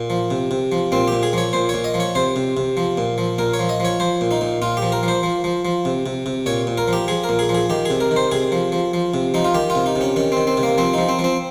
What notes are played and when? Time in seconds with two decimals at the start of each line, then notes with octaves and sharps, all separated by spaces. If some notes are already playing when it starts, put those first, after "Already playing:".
Already playing: A#2
0.10 F3
0.31 C3
0.51 C3
0.72 F3
0.92 A#2 C4
1.08 A#2 G4
1.23 G#4
1.33 F3 C#5
1.53 A#2 C5
1.69 C#5
1.74 A#2
1.84 D#5
1.94 F3
2.00 C#5
2.15 C3 C5
2.36 C3
2.57 C3
2.77 F3
2.98 A#2
3.18 F3
3.38 A#2 A#4
3.54 C#5
3.59 F3
3.69 D#5
3.80 F3 C#5
4.00 F3 C5
4.21 A#2
4.31 D#4
4.41 A#2
4.62 A#2 F4
4.77 G4
4.82 F3
4.92 A#4
5.03 F3
5.08 C5
5.23 F3
5.44 F3
5.65 F3
5.85 C3
6.06 C3
6.26 C3
6.46 A#2 C#5
6.67 A#2
6.78 A#4
6.88 F3
6.93 G4
7.08 F3 G#4
7.24 A#4
7.29 A#2
7.39 G#4
7.49 F3
7.54 G#4
7.70 D#3 G4
7.85 C3 G#4
8.00 A#4
8.11 D#3
8.16 C5
8.32 C3 G#4
8.52 F3
8.72 F3
8.94 F3
9.14 C3
9.34 F3 D#4
9.45 F4
9.55 D#3 G4
9.70 F4
9.75 C3
9.86 D#4
9.96 C3
10.01 C#4
10.16 D#3 C#4
10.32 D#3 C4
10.47 C4
10.57 C3
10.63 A#3
10.78 F3 C4
10.94 F3 D#4
11.09 C4
11.19 F3
11.24 C4